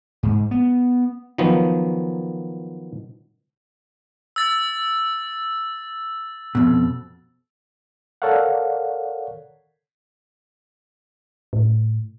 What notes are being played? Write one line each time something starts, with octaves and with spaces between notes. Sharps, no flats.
G#2
B3
D#3 F3 F#3 B3
E6 A6
F2 B2
A4 A#4 C#5 D5 F5 F#5
A2